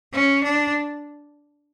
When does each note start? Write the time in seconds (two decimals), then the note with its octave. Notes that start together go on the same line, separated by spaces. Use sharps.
0.13 C#4
0.43 D4